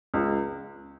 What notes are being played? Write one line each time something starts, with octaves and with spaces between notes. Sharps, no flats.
C#2